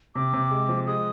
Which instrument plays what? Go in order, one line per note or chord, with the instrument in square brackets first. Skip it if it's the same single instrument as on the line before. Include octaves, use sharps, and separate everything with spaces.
[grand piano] C3 [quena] D6
[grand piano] C3
G#3
F3
[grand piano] G#3 [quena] D#6